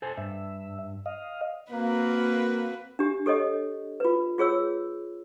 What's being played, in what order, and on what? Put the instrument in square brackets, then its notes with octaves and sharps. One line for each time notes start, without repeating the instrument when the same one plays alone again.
[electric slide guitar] A4 C5 G#5
[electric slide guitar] G2 [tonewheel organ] E5
[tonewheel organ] D#5 F5
[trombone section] A#3 [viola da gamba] C4 F#4 B4
[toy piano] D4 G4
G4 A4 C#5 D#5
F4 B4
F4 G#4 C#5 E6